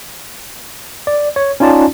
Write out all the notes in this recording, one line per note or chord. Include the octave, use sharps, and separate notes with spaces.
D5
C#5
C#4 D#4 F4 D5 A5